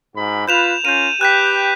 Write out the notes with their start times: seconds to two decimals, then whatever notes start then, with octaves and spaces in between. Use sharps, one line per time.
0.16 G#2 F#4 B5
0.48 F4 B4 G6 E7 F7
0.85 C#4 F4 A#4 G6 D#7
1.21 G4 B4 G5 F#6 G6 B6